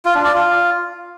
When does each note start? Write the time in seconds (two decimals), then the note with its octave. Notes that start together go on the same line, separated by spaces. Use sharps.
0.05 F4
0.15 D4
0.24 D5
0.34 F4